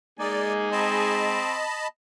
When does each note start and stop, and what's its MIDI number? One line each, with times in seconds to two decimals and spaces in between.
0.19 1.43 56
0.19 0.69 58
0.19 1.35 63
0.19 1.35 68
0.19 0.53 74
0.19 1.35 80
0.72 1.61 60
0.72 1.88 75
0.72 1.88 81
0.72 1.88 83